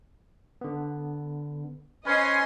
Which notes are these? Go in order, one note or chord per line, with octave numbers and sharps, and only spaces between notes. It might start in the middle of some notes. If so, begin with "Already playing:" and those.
D3 B3
C#4 B4 C5 D#5 G#5 C6